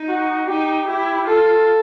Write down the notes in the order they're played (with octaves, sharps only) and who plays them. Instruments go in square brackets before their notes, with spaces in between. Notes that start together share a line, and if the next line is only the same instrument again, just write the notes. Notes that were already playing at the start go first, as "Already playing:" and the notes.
Already playing: [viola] D#4
[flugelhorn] F#4
[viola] D#4 [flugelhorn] G4
[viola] E4 [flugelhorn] G4
[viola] F4 [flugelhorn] A4